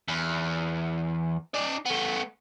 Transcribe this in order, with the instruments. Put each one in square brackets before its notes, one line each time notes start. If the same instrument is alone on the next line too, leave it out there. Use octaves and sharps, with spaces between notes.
[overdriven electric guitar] E2
D#4 D5
A3 B3